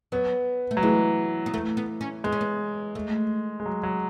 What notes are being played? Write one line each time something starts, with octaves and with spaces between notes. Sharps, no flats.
F#3 B3
A3
F#3
E3 G#3
B3
A3
B3
C#4
G#3 B3
C#4
B3
A3
G#3
F#3
F#3